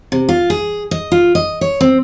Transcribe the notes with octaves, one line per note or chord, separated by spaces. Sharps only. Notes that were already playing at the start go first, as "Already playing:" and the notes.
C3
F4
G#4
D#5
F4
D#5
C#5
C4